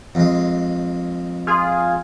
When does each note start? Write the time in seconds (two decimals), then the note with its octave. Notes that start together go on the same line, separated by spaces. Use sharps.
0.15 F2 G#3
1.47 F4 G#4